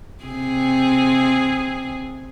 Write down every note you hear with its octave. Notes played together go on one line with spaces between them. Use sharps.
C3 C4 G#4